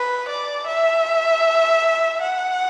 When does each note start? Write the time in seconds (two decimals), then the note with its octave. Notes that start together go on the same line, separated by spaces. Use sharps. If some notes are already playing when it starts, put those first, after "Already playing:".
Already playing: B4
0.29 D5
0.67 E5
2.22 F#5